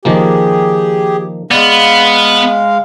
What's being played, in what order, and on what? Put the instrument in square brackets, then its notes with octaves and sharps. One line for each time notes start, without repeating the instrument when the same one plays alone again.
[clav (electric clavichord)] D#3 F3 A#3 [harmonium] G4 G#4
[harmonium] G#3 F5 [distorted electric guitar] B3 [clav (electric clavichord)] D5